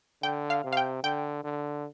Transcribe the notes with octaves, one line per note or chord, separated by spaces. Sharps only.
D3 G5
F5
C3
F5
G5
D3 G5
D3